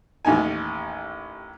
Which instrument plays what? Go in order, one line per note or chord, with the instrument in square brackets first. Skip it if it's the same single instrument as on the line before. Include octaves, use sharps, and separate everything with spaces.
[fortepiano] A1 D#2 D#4 G#5